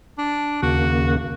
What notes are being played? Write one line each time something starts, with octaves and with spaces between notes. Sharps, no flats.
D4
D#2 C#3 A#3 F#4